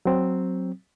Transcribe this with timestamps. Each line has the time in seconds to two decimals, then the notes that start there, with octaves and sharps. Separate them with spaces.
0.05 F#3 C4